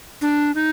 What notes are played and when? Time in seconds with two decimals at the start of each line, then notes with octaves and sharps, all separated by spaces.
0.22 D4
0.55 D#4